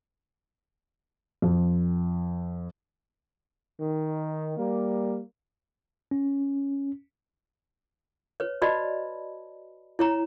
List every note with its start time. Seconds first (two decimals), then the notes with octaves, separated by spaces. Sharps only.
1.42 F2
3.79 D#3
4.57 G3 A#3
6.11 C#4
8.40 B4 C#5
8.62 F#4 B4 D5 D#5 A5 B5
9.99 E4 C#5 A#5